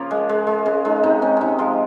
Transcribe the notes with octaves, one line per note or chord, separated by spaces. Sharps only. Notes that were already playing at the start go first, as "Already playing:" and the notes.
Already playing: C#3 F3 A#3 F4 A#4
G#3
G#3
G#3
C#3
G#3 D#4
C3 D#4
C3 C#4
C3 C#4 D#4
F3 G#3 F4